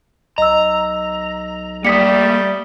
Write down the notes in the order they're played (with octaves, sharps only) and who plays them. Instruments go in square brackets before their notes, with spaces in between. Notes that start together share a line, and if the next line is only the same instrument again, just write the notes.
[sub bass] B1 [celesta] D#5 E6 [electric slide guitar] A#5
[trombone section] G3 [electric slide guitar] A3 A#3 [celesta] D#6 B6 C#7